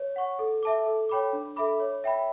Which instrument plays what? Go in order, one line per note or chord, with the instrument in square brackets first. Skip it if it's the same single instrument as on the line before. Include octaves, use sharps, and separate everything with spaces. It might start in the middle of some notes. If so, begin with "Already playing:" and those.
Already playing: [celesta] C#5
F#5 C#6
A4
E5 A5 D6
A4
C#5 G5 B5 D6
D4
A4 E5 B5 D6
C#5
E5 G5 B5